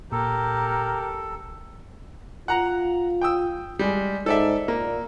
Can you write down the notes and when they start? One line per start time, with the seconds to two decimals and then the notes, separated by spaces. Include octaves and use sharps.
0.12 A#2 G4 A4 A#4
2.48 F4 F#5 A#5
3.21 G5 D#6 E6
3.79 G3 G#3
4.26 G#2 A4 D5 E5
4.68 A#2 A#3